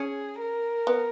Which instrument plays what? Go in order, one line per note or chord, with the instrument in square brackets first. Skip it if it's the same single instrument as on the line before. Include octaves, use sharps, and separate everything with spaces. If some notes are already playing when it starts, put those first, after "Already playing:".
Already playing: [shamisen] C#4 [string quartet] G#4
[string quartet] A#4
[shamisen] B3